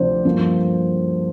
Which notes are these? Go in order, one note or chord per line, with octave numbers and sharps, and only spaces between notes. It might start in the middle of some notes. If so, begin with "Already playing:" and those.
Already playing: D2 C3 F3 C5 D5
G2 F3 A#3